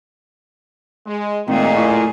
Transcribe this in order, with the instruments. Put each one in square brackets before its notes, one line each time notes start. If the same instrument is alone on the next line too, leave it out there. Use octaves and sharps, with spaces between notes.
[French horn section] G#3
[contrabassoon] G#1 [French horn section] A#2 [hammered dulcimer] D#3 [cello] A3 G#4
[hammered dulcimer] F#2 C#3 C#6 [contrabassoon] A2